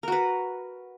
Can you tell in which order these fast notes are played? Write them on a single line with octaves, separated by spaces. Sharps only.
A#4 F#4 B4